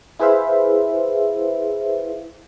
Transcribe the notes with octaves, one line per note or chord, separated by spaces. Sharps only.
E4 G#4 B4 C5 E5 F5